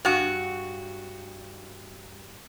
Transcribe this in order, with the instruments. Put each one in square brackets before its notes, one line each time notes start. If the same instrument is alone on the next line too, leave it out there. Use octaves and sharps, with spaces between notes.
[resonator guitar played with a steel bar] G2 F#4